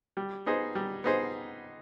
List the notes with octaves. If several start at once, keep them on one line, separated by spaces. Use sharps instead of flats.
G3
B3 D#4 G#4 C5
G3
B3 D#4 G#4 C5